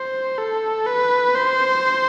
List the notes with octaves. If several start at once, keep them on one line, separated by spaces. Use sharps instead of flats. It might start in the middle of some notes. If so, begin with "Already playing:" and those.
Already playing: C5
A4
B4
C5